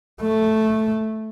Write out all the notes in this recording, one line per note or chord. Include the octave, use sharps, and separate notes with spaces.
A3